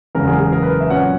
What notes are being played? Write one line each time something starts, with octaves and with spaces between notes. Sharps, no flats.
F#1 E2 C#3 G#3 A#4
G#4
G#4
A#4
B4
E5
A#2 F#3 C#4 F#5